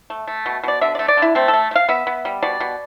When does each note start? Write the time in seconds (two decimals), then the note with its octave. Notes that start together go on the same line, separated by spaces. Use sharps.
0.10 A3
0.28 A3
0.46 B2
0.63 B2 D5
0.81 D3 E5
0.95 D5
0.99 A3
1.08 D5
1.17 D3 E4
1.35 A3 C4
1.48 A4
1.53 A3
1.71 A3
1.75 F5
1.89 B3 E5
2.07 B3
2.25 G3
2.43 B2 D5
2.60 B2